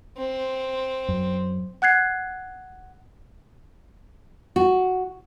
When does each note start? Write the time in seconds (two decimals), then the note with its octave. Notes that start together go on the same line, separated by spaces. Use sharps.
0.17 C4
1.08 F#2
1.82 F#5 F#6 G#6 C7
4.56 F#4